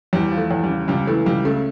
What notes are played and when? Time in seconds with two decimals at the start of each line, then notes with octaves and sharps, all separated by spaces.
0.13 E2 G3
0.31 F3
0.38 A3
0.51 E2
0.64 G3
0.69 C#3
0.88 C#2 G3
1.07 E3 A3
1.26 C#2 G3
1.45 C#3 A3